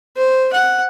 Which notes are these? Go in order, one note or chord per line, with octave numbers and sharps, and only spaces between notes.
C5
F#5